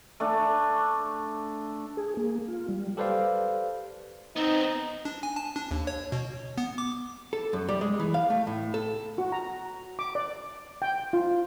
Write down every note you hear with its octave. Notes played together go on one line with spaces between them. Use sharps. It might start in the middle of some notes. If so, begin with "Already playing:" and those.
A3 D4
G#4
A#3
F4
G3
G4 A4 B4 C5 D5 F5
B3 C4 D#4
D4
G#5
A5
D4
D#2
C#5
B2
B3
D6
A4
F#2
G3
G#3
E3
F5
A3
A2
A4
F#4
A#5
D6
D5
G5
F4